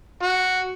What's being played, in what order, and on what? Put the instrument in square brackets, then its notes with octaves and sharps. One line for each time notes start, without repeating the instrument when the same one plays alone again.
[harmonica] F#4